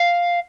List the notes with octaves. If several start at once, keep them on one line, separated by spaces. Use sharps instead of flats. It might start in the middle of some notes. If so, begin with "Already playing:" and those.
Already playing: F5